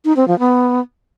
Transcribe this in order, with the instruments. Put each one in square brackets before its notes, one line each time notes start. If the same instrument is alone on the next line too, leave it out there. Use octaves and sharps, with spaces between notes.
[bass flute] D#4
C4
F3
B3